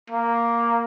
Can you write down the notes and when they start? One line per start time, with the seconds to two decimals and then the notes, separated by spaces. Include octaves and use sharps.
0.10 A#3